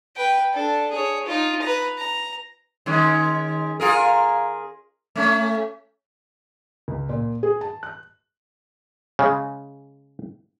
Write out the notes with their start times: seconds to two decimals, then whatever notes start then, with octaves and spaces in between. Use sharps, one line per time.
0.16 B4 G5
0.53 D4 A4
0.91 G#4 C#5
1.26 D#4 F4
1.62 B4 A#5
1.98 A#5
2.86 D#3 G#3 C#4
3.80 F4 G#4 A#4
5.16 A3 C#4
6.88 C#2
7.09 A#2
7.43 G#4
7.61 A5
7.83 F#6
9.19 C#3 G#3